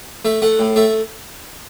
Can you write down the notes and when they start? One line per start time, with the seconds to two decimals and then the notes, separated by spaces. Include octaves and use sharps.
0.25 A3 E5
0.42 A3 F#5
0.59 A2
0.76 A3 E5